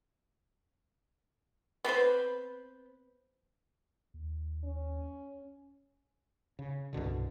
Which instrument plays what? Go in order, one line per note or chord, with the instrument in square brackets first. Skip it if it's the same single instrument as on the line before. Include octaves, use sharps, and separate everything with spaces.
[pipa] B3 C4 B4 C5
[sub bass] D#2
[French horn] C#4
[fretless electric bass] C#3
C2 G2 B2 D3